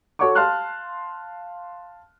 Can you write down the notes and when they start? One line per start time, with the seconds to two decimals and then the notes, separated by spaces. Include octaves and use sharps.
0.19 F#4 A4 C#5 F#5 C#6 D6
0.35 F5 A5 C6 F6 F#6